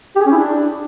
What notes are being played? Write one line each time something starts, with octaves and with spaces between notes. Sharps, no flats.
G4
G#4
C#4
E4
D4